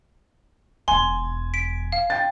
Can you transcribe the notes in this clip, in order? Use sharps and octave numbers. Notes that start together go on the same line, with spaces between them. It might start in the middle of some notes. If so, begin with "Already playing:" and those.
E1 E2 G#5 C6
B6 D7
F5
G5 A6